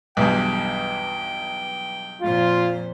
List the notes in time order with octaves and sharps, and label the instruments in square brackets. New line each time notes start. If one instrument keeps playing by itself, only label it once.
[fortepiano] B1 E2 G2 [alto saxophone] G5
[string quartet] F2 A#2 C5 [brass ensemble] F4